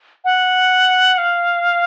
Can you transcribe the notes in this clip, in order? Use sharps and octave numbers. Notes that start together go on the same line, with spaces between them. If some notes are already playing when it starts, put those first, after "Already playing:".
F#5
F5